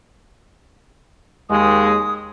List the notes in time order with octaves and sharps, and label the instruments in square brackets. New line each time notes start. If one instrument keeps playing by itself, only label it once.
[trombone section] D#2 G#3 [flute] D#6